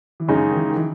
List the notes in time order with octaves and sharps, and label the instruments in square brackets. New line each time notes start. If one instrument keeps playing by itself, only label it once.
[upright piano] E3
[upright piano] F#2 F#3 [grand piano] C#3 G#3 D#4
[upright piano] D#3
E3
D#3
E3